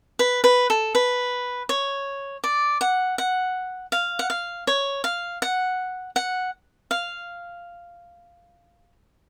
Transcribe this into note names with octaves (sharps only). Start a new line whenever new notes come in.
B4
B4
A4
B4
C#5
D5
F#5
F#5
F5
F#5
F5
C#5
F5
F#5
F#5
F5